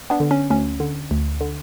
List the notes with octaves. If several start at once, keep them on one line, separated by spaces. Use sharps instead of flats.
B3 D4
D3
C#4
D2 C#4
D3
D2
D3